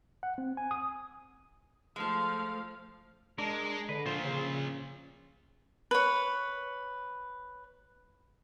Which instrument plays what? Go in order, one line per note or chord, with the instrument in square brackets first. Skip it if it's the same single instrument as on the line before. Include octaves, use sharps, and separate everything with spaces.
[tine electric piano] F#5
C4
G#5
D#6
[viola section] F3 A3 F5 [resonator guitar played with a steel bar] G#3 A4
[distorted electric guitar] G#3 [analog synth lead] D4 [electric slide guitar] A#4
[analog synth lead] D3 [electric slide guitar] B4
[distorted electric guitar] A#2 F3 [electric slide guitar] F4 C5
[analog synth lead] C#3
[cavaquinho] B4 C#5